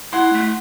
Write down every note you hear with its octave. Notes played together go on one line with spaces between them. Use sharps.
E4 F#5 C6
A3